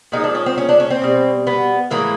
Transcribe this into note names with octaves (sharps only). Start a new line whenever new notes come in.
A#2 F3 G#3 D#4
D4
C#4
C4
C#4
D4
C#4
C4
B2 G3
B3
A2 E3 G#3 A#3